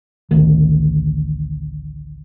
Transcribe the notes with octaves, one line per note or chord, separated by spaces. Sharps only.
A1 D2 D#3